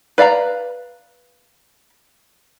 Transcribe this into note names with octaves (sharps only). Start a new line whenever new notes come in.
B4 D5 F5 A5 A#5